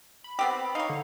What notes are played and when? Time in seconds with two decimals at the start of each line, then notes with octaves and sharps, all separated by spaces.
0.24 B5
0.39 B3 C4 G4
0.75 D#4 C#5 F5
0.89 D3